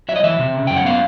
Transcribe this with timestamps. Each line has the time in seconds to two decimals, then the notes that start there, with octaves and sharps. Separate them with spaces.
0.09 F#3 E5
0.16 D#5
0.24 E3 E5
0.39 C3
0.54 C#3
0.67 F#2 G5
0.76 F#5
0.85 B3 F5